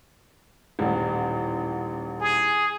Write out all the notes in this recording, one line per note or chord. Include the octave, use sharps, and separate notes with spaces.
D#1 A1
G#4